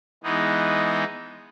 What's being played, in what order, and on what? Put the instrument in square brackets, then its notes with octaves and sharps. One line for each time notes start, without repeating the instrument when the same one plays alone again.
[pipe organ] E3 G#3 B3 D#4